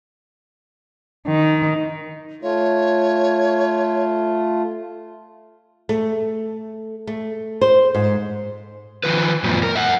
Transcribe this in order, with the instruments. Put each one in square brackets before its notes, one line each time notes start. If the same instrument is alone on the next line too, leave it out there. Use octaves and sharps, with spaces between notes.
[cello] D#3
[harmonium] A3 F4 [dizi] C#5
[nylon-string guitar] A3
A3
C5
G#2
[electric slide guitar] D#3 F3 B4
F#2 A#2 F3
A#4
E5 F#5